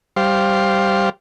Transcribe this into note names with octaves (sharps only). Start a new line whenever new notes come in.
G3 C5 F5